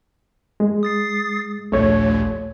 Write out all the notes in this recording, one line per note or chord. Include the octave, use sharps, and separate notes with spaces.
G#3
D#6 A6 C7
A#1 D#2 A#2 A3 C#5 G#6